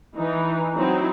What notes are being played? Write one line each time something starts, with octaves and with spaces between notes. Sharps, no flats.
E3 D#4
F#3 C4 D#4 E4